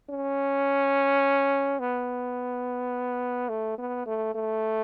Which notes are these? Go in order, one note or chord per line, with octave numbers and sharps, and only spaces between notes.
C#4
B3
A3
B3
A3
A3